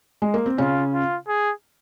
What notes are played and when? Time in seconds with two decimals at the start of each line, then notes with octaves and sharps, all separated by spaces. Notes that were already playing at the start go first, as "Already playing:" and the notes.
0.22 G#3
0.34 A#3
0.46 C4
0.58 C#3 C#4 F4
0.93 F4
1.28 G#4